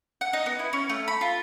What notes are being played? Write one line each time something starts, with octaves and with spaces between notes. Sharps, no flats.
F#5
D#4
B3
E4
C#4
A3
B5
F4